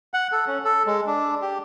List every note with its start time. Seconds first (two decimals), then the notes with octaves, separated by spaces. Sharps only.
0.14 F#5
0.32 A4
0.47 C#4
0.65 A4
0.87 G#3
1.07 D4
1.42 G4